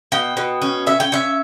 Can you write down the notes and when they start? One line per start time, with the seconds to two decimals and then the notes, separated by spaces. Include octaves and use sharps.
0.12 B2 G5
0.37 B2
0.62 C#4
0.87 C#4 E5
1.00 G5
1.12 C#4 E5